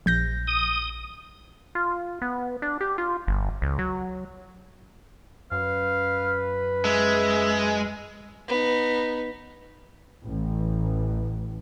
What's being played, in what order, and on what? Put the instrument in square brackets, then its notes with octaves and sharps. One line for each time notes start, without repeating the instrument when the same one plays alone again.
[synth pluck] A#1 G6 A#6
[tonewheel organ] D#6
[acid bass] F4
B3
D4
G4
F4
G1
C#2
F#3
[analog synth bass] F#2 [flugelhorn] B4 [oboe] F5
[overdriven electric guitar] G#3 [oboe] E5
[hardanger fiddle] B3 D#4
[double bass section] A1